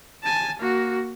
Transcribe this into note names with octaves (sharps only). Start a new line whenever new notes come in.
G#5 A5
A#3 F#4